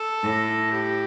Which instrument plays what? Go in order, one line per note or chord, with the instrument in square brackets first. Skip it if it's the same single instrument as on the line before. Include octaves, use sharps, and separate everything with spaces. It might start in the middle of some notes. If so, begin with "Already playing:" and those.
Already playing: [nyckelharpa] A4
[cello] A2
[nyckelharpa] G4